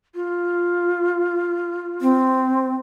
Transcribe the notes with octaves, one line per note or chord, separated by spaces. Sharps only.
F4
C4